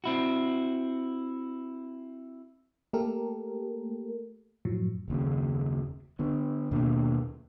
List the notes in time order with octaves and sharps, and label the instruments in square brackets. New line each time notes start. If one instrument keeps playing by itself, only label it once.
[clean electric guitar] C4 E4 F#4
[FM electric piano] A3 A#3 G4 A4 A#4
F#2 A2 F3 F#3
[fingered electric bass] F#1 D#2 C#3
D3 B3
D#2 B2 A#3 D4